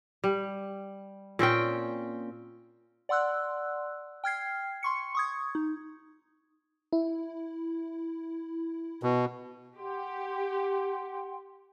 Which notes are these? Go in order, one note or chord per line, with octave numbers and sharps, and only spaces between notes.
G3
A#2 C4 C#4 G5
D5 F#5 C6 E6 F#6
G5 F6 G#6 C7
C6 C#6 C#7
C#6 D#6 G#6
D#4
E4
B2
G4 F#5 G5 C6